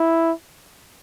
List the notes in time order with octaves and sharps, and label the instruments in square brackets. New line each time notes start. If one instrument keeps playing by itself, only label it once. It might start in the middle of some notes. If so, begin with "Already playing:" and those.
Already playing: [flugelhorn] E4